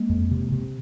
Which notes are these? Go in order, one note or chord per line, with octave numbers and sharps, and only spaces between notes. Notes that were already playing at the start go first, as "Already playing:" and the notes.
Already playing: G#3 A#3
F2
C3
C3